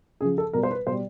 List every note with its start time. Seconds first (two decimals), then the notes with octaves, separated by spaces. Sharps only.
0.21 C#3 F3 G#4
0.38 A4
0.53 B2 G3 A#4
0.63 C5
0.71 B4
0.87 B2 G3 C5